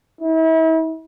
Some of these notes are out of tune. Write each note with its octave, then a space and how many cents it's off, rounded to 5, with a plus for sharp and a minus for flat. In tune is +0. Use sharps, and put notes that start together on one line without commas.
E4 -40